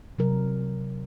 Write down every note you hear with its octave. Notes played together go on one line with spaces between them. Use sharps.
C3 F#3 A#4